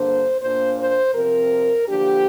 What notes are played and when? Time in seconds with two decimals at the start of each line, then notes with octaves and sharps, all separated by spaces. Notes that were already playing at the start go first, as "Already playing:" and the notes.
Already playing: G2 D3 A#3 D4 C5
0.41 A#2 A#3 D4 C5
0.78 C5
1.14 C3 F3 C4 A#4
1.87 D3 F3 A#3 D4 G4